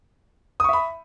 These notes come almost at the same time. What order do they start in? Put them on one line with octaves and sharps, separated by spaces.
D#6 C#6 E5 B5